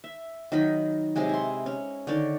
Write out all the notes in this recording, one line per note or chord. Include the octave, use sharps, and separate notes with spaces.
E5
D#3 F#3 D#5 B5
C3 F#3 G#3 G#4
E4 C6
C#4
D3 D#3 C#5 D5